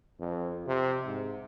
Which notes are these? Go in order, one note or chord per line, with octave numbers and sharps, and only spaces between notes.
F2
C3
G#2